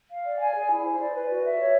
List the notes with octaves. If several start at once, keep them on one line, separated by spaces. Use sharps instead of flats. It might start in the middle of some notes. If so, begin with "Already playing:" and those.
F5
D5
G#5
G#4
E4
C5
D5
B4
F#4
E5
C#5